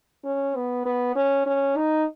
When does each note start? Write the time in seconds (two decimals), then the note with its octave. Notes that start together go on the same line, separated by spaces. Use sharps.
0.25 C#4
0.56 B3
0.85 B3
1.16 C#4
1.46 C#4
1.77 D#4